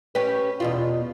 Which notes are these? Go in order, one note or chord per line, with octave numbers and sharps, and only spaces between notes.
C#4 G4 B4
E2 B2 F4